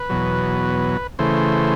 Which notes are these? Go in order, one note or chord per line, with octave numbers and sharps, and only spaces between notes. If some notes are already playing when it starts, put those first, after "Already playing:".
Already playing: B4
E2 B2 F#3
C#3 E3 A3 C5